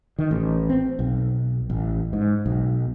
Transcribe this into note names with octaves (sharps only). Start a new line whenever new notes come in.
D#3
A1
C4
B1
A1
G#2
B1